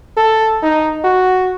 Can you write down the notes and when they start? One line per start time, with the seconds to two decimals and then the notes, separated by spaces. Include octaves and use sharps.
0.17 A4
0.62 D#4
1.04 F#4